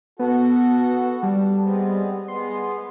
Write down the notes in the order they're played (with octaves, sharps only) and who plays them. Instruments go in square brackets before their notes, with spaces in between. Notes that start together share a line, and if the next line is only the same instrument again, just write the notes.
[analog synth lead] B3 [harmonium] F#4 A4
[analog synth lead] G3 [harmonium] D4
[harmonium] G#3 B3 C4
[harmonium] G#3 B3 [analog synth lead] C6